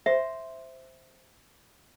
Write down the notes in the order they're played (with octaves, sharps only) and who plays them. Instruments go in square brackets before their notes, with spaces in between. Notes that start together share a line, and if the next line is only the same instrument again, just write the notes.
[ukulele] C5 [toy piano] E5